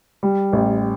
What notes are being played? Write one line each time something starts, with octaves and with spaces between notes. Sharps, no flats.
G3
A1